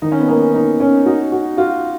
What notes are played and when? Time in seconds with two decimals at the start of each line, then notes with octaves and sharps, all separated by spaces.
0.02 D#3 D#4
0.12 C#4
0.20 B3
0.28 A#3 C#4
0.54 A#3 D#4
0.80 C#4
1.06 D#4 F#4
1.32 F#4
1.57 F4 F#4